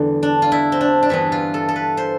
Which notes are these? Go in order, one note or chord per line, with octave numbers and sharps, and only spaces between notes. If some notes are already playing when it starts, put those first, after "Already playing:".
Already playing: E2 D3 G3 B3
D4
F4
E4
C4
D4
D4
G2 E3 B3 E4
F4
A4
A4
B4
C5